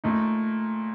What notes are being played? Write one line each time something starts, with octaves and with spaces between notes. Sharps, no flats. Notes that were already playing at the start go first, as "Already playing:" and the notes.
A#2 A3 D#4